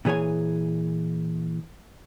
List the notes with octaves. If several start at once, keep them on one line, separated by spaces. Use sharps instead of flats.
A#2 E3 G#4 C#5 G#5